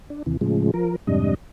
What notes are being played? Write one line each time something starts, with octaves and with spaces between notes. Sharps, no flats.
D4
D#2 C3 E3
A2 C#3 F3 G#3
F3 A#4
F2 G#2 C3 G3 D4 D#5